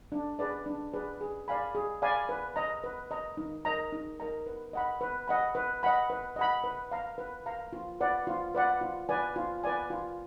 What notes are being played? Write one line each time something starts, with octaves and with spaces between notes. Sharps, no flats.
D4
G#4 B4 D5
D4
G#4 B4 D5
G#4
D5 F5 G#5 B5
G#4
D5 F5 G#5 B5
B4
D#5 A#5
B4
D#5 A#5
D#4
A#4 D#5 A#5
D#4
A#4 D#5 A#5
B4
D#5 F#5 B5
B4
D#5 F#5 B5
B4
D#5 F#5 B5
B4
D#5 F#5 B5
B4
F5 A#5
B4
F5 A#5
F4
B4 D5 F#5
F4
B4 D5 F#5
F4
B4 D5 G#5
F4
B4 D5 G#5
F4